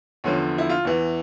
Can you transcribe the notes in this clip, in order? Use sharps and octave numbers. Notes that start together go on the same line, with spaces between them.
E2 D3 F3 C#4
E4
F4
E2 E3